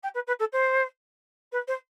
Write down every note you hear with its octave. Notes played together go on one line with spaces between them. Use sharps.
G5
B4
B4
A4
C5
B4
C5